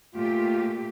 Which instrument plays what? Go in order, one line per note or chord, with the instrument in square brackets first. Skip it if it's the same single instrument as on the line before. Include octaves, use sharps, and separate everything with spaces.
[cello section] A#2 A3 G4 [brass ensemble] F4